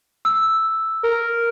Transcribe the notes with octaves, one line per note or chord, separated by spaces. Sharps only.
E6
A#4